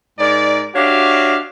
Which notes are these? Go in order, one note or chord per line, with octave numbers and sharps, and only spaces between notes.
G#2 D#4 A#4 D5
D4 F#4 G4 C#5 E5 F5